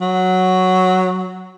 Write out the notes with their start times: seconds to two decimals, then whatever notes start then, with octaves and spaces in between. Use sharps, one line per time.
0.01 F#3